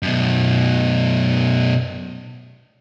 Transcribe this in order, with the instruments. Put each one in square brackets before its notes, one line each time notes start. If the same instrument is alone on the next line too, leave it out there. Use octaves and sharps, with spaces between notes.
[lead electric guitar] F#2 B2